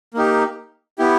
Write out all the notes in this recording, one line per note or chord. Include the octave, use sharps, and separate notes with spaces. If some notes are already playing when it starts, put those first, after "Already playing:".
A#3 D#4 G4
B3 E4 G4